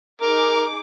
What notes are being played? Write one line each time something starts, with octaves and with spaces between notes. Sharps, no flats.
D#4 G#4 A#4 D6